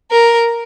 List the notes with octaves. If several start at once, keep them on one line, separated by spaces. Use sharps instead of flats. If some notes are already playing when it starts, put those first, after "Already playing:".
A#4